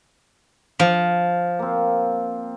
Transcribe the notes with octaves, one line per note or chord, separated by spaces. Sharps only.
F3
A#3 C4